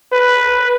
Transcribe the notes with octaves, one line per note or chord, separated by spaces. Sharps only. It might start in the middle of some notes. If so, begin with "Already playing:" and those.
B4